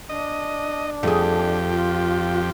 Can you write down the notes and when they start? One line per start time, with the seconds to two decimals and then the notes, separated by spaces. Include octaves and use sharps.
0.09 D4 D#5
1.03 F2 A3 G4 G#4
1.69 F4